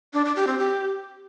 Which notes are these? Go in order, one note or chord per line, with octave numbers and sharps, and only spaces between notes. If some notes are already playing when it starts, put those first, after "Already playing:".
D4
D4
G4
C4
G4